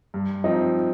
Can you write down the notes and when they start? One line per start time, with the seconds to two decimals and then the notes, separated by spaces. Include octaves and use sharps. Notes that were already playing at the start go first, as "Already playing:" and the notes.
0.14 G2
0.44 F3 C4 D#4